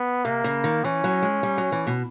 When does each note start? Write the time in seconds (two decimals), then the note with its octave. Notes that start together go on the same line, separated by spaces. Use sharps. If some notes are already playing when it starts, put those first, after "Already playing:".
Already playing: B3
0.25 C3 A#3
0.44 C#3
0.64 D#3
0.84 E3 C#4
1.04 F#3
1.22 G#3
1.43 G3
1.58 F#3
1.72 E3
1.87 B2